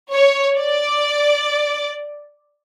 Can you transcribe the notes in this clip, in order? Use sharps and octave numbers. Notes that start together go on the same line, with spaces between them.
C#5
D5